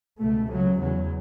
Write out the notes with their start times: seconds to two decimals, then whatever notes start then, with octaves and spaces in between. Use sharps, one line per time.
0.18 C#2 B2 A3
0.49 C#2 C#3 F#3
0.80 E2 C#3 F#3